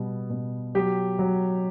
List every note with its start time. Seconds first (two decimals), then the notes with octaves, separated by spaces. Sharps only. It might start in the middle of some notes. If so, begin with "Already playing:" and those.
Already playing: B2 G3
0.30 B2
0.75 F#3 G4
1.19 F#3